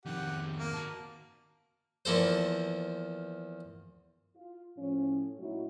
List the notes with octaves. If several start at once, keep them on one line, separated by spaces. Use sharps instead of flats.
F2 D#3 G4 F#5
A#3
F#4 A5
E2 F3 A#3 A4 C5
F4
A2 F3 C#4
A#2 F#3 A3 D#4 E4 F#4